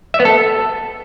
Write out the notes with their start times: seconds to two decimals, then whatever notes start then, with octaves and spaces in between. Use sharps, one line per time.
0.14 E5
0.20 B3
0.25 A4